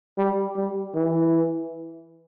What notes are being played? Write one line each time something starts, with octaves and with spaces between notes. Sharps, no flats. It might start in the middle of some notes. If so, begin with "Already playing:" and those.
G3
G3
E3